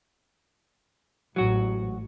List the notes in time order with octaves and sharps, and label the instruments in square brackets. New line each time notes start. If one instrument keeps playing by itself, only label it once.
[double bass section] A1 G#2 [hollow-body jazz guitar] F#3 F#4